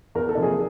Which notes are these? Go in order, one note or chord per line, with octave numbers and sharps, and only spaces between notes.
E2 A#4
A4
C3 F3 A#3 D#4
G#4